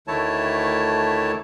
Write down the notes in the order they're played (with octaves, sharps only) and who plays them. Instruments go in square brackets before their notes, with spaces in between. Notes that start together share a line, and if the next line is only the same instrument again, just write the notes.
[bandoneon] D2 D#3 A3 E4 C#5 A5